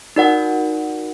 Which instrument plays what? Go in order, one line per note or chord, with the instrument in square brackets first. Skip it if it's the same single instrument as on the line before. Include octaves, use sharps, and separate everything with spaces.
[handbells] D#4 F#4 A#4 D5 F#5